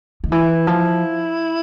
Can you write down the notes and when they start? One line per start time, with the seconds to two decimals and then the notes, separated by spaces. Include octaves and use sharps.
0.24 D#3
0.31 E3 E4
0.67 F3